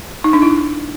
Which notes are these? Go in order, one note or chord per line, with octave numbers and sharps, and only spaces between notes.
D#4
D4
E4